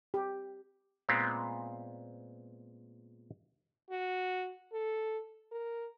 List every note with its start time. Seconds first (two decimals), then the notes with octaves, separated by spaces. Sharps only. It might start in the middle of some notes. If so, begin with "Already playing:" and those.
0.14 G4
1.09 A#2 G#3 B3 C4
3.90 F#4
4.73 A4
5.52 A#4